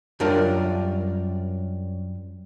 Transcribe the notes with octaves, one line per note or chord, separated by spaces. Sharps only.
F#2 G3 D4 F4 A#4 D5